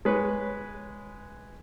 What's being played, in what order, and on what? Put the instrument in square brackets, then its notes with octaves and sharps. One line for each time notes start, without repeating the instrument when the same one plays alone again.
[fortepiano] G#3 B4 C#5